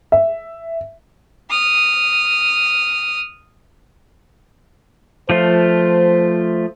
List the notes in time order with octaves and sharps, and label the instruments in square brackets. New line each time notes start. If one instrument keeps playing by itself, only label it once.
[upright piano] E5
[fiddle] D#6 F6
[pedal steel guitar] F3 A3 F4 [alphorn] C5